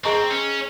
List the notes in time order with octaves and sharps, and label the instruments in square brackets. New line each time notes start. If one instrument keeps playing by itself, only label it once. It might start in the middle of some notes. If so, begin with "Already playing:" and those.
[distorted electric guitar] C4 [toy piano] G#4 D#5 A#5 C#6
[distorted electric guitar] C#4